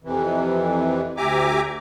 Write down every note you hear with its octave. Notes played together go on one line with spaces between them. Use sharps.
F2 C3 E3
D2 G4 E5 G#5 A#5 D6